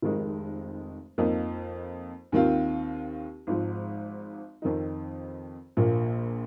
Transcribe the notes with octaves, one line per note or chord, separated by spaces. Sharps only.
F1 F2 D#3 G#3 D#4
F2 F3 A#3 D#4
D#2 D#3 C4 F4
G#1 G#2 F3
F2 D#3 C4 D#4
A#1 A#2 F3 A#3